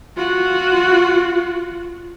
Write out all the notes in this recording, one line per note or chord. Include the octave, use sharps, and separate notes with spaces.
F4 F#4